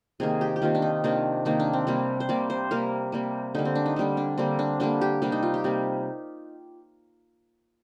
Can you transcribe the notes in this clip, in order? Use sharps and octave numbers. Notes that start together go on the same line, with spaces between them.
C3 D#3 A#3 G#4
G4
G4
C3 D#3 A#3 F4
D4
D#4
C3 D#3 A#3 D4
C3 D#3 A#3 D#4
D4
C4
C3 G3 A#3 D4
C5
C3 G3 A#3 D5
C5
C3 G3 A#3 A#4
C3 G3 A#3
D3 G3 A#3 D#4
C4
D4
D#4
D3 G3 A#3 D4
D4
D3 G3 A#3 C4
D4
D3 G3 A#3 D4
G4
C3 G3 A#3 D4
D#4
F4
G4
C3 G3 A#3